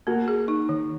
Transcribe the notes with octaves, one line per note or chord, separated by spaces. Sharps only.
A#3 F#4 A#4
G#4
D#4
D#3